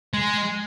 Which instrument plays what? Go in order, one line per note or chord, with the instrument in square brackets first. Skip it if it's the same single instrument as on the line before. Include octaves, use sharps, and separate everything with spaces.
[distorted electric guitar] G#3